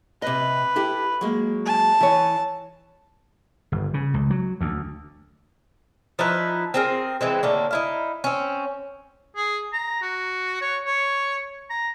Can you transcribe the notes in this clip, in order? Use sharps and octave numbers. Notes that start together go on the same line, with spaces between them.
C3 B4 D#5
E4 G4 A4
F#3 G#3 A#3
A5
E3 C#5
G1
C#3
C#2
F#3
D2
F3 D#4 E4 B4
C4 G#4 A#4
E3 G#3 C4
A2 D3 A#3
D#4 E4 F5
C4 C#4
G#4
A#5
F#4
C#5
C#5
A#5